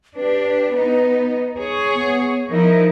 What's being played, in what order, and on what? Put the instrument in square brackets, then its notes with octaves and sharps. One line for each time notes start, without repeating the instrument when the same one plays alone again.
[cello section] D4 G4 [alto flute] B4
[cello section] B3 D#4
G#4 C#5
[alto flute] B3
[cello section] F3 D#4 E4 [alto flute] A#4